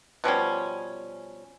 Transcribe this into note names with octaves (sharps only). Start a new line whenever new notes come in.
B2 F3 G3 C#4